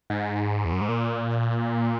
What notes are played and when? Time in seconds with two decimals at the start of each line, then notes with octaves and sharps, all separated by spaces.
0.10 G#2
0.65 E2
0.72 F#2
0.81 G#2
0.89 A#2